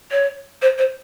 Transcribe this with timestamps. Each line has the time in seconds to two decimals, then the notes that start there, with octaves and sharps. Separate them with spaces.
0.11 C#5
0.62 C5
0.78 C5